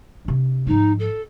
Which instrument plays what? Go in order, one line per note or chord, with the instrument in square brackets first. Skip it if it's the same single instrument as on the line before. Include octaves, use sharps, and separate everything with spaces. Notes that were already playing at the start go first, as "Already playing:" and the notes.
[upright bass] C3 D4
[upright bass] G#2 F3 [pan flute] D#4
[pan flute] A4